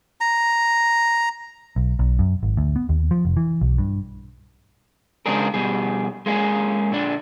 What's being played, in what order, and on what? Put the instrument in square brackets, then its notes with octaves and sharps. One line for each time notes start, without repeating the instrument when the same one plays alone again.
[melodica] A#5
[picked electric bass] B1
B1
F#2
G#1
D2
B3
D#2
F3
F1
E3
B1
G2
[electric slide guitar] C#3 G#3 C4 D4 G#4 A#4
B2 G3 G#4
G#3 A#3 C#4 G#4
A#2 D3 D4